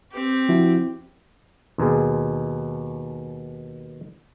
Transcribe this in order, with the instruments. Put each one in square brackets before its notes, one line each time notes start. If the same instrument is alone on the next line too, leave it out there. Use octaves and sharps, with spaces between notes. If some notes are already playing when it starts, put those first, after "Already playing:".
[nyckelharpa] C4 G4
[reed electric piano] F3 E4 F#4
[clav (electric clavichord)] D#2 B2 G#4